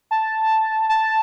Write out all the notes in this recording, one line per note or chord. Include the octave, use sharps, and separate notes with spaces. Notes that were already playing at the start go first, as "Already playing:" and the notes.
A5
A5